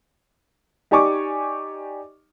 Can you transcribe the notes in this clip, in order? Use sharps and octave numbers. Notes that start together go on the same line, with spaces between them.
D#4 G4 D5 G#5 C#6 D6